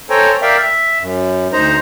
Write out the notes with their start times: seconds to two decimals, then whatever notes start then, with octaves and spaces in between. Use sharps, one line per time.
0.10 A4 C5 C#5 G5 G#5 A#5
0.42 A#4 D5 E5 F5 G5
0.57 E5
1.01 F#2
1.53 D2 D#4 C5 A#5